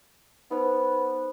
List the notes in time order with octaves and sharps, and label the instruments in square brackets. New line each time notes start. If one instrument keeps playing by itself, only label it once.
[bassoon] B3 [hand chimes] D#4 C5